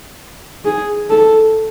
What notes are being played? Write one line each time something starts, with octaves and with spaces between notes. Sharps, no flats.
G#4
A4